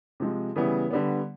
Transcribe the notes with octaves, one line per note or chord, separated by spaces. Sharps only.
C3 F3 G#3
C#3 E3 G3 B3 E4
D3 G3 B3